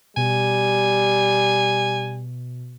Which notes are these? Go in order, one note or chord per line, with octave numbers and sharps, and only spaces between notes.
B2 G3 G#5